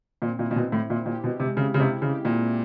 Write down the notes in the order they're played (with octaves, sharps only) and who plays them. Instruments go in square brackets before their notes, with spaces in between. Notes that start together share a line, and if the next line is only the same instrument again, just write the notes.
[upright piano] A#2 [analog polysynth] C4
[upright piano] A#2 [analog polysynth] E4
[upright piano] A#2
[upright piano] B2 [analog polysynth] C4
[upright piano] A2 [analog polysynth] C4
[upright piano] A#2 [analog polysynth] E4
[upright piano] A#2 [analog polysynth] G4
[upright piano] B2 [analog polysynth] C4
[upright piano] C3 [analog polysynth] G#3
[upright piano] C#3 [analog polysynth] E4
[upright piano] C#3 [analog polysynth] G#3
[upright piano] C3
[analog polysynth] E4
[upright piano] C#3
[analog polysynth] G4
[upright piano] A#2 [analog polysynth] E4
[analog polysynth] C4